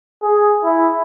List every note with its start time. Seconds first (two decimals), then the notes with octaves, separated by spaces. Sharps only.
0.23 G#4
0.64 E4